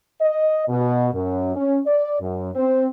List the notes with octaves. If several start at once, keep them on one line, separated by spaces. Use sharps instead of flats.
D#5
B2
F#2
C#4
D5
F#2
C4